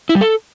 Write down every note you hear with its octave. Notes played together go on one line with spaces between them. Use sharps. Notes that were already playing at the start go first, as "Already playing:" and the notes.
E4
G3
A4